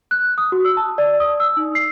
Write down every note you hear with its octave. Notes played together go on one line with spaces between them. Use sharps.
F#6
D#6
F#4
E6
A5
D5
D#6
E6
D#4
C7